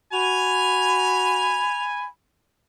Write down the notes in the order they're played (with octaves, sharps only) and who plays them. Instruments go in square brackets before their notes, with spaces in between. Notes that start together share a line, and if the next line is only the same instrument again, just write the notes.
[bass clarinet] F#4 [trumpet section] G#5 [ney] B5 [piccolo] F7